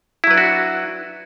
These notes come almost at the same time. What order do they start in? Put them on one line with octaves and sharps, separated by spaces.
E4 F#3 B4 D4 F#4